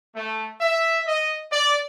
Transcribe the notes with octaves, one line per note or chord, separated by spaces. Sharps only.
A3
E5
D#5
D5